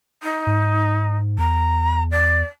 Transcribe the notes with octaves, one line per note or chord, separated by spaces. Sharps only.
D#4
G#2
E2 A#5
D5